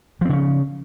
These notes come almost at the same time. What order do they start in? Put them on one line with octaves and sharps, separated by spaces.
F3 C4 C#3 C#4